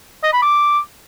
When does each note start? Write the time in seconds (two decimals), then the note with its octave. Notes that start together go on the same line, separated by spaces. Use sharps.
0.24 D#5
0.33 B5
0.42 D6